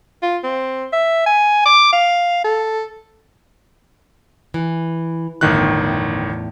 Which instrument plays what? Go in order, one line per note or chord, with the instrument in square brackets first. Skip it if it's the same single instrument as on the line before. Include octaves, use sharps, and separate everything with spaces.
[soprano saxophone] F4
C4
E5
G#5
D6
F5
A4
[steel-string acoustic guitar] E3
[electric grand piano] G1 D#3 F#6 [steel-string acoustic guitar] E2 A2